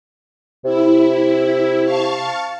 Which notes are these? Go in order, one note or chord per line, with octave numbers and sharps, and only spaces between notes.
C3 E4
F5 A5 C#6